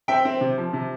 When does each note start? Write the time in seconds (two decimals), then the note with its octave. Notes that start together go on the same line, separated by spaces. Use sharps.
0.08 C4 E5 G5
0.25 C4
0.41 C3
0.58 F3
0.73 C3